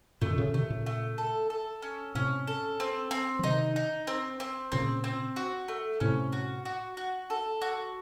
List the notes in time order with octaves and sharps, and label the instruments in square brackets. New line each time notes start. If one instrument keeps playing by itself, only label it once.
[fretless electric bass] F#2 A#2 [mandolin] A3
[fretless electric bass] D#3
A#2 C#3
[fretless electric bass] C3 D#3 [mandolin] A3
[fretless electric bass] A#2 C#3
[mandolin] A3
A4
A4
C#4
[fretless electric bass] A2 C3 [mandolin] C#4
[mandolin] A4
C4
C4
[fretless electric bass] F3
[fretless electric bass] C3 D#3 [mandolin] D#4
[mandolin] D#4
C4
C4
[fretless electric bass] A#2 C#3 [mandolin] C4
[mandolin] C4
F#4
A3
[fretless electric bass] A2 C3 [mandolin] C#4
[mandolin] F#4
F#4
F#4
A4
F#4